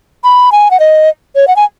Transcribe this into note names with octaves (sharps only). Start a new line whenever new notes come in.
B5
G#5
F#5
D#5
C#5
F#5
G#5